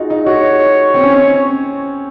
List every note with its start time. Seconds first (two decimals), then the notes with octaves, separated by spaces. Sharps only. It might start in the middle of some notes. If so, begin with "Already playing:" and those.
Already playing: D#4 F4 F#4 G#4
0.10 D#4
0.26 F#4 C#5
0.94 C4
1.03 C#4
1.13 C4